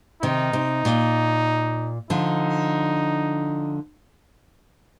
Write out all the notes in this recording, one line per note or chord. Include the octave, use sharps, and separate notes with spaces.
C3 D#3 D#4
C3
A#2
D3 F3 D#4